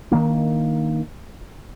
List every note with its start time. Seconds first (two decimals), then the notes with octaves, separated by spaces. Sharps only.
0.11 D#3 A#3 D4